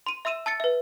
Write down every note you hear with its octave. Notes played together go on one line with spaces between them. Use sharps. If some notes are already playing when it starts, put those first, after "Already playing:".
C6 D#7
E5 C6 E6 D#7 E7
A5 E6 A6 C#7
B4 E5